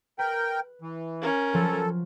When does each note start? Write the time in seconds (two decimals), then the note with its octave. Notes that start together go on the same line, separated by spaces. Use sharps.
0.19 A#4 B4 G5
0.82 E3
1.21 C#4 A#4
1.54 F3 F#3 A4